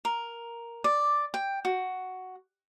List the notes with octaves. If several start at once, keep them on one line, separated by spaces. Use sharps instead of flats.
A#4
D5
G5
F#4